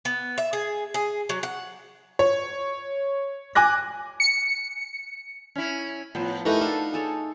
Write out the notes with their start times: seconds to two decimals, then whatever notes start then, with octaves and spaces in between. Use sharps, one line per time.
0.05 B3
0.38 E5
0.53 G#4
0.94 G#4
1.29 F#3
1.43 F#5
2.19 C#5
3.55 G#5 D6 F#6 A#6
4.20 C#7
5.55 C#4 E4
6.15 A2 F3 B3
6.45 E3 A3 D#4 G4 A#4 B4
6.61 D4 A4 F5 F#5
6.94 G#4 A4 C#5